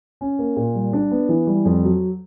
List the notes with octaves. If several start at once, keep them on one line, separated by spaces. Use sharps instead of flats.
C#4
A#3
A#2
G3
D4
B3
E3
G3
F2
F#3